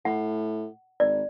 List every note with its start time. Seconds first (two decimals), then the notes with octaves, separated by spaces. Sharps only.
0.05 A2 F#5
1.00 G#1 D5